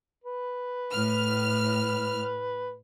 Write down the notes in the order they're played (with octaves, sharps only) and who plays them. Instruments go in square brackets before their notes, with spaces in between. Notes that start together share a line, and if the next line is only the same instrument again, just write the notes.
[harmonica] B4
[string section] A2 F6